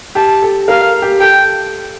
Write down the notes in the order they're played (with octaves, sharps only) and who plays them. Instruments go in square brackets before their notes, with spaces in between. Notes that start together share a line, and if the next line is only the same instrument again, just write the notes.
[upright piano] G4 [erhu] A5
[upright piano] A4
[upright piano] A#4 [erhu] F5
[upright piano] G4
[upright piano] A4 [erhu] G5